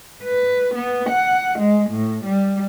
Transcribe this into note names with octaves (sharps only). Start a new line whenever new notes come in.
B4
B3
F#5
G#3
A2
G3